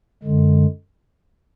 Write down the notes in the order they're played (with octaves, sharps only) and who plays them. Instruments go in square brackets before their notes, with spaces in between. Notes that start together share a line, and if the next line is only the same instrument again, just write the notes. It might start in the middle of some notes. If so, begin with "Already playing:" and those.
[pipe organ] F#2 D3 G#3